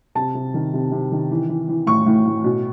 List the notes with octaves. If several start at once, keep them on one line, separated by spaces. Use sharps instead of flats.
C3 A5
C3
D#3
C3
C3
D#3
E3
E3
E3
A2 C#6
A2
A2
B2